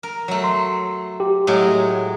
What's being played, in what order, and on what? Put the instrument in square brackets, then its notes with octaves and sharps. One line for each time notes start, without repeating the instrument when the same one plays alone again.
[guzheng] A#4
F#3 A3
[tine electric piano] C6
G4
[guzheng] A2 F#3 G#3